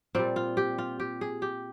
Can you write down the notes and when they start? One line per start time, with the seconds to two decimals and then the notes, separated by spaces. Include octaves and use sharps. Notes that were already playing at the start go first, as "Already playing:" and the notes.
0.15 A#2 G3 C4
0.36 F4
0.57 G4
0.78 F4
1.00 G4
1.21 G#4
1.42 G4